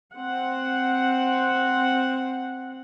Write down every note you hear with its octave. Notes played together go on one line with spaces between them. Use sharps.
C4 F#5